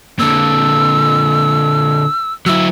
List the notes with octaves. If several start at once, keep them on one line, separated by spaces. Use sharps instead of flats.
A#2 D3 E6
F#3 E4 E6